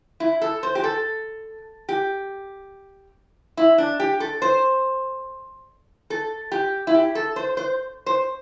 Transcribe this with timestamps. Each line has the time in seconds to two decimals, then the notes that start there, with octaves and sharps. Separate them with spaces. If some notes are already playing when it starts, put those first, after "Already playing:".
0.20 E4
0.41 A4
0.63 C5
0.75 G4
0.84 A4
1.89 G4
3.57 E4
3.78 D4
4.00 G4
4.20 A4
4.42 C5
6.10 A4
6.52 G4
6.87 E4
6.94 G4
7.15 A4
7.36 C5
7.57 C5
8.06 C5